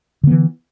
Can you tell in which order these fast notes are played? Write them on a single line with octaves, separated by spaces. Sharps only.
D3 B3 E3